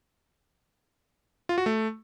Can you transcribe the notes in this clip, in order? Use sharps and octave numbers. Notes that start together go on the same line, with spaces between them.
F4
F#4
A3